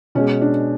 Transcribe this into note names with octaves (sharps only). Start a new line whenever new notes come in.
B2 G#3 C#4
D4